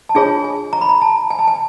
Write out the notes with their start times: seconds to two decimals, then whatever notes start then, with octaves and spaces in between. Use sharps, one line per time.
0.09 A5
0.15 D4 F4 G#4 C#5 G#5
0.44 G#5
0.73 A#5
0.81 B5
0.89 A#5
1.02 A5
1.30 G#5
1.39 A5
1.48 G#5